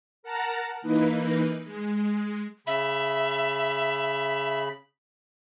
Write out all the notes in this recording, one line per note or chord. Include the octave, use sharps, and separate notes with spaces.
A#4 F#5 A5 A#5
E3 A#3 D#4 B4
G#3
C#3 E5 B5